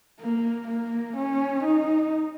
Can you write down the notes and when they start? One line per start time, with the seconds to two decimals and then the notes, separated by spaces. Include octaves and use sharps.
0.20 A#3
0.67 A#3
1.16 C#4
1.63 D#4